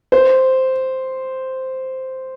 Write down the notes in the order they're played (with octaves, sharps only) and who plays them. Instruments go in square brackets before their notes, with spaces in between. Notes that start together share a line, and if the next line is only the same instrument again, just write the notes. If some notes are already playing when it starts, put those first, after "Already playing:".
[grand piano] C5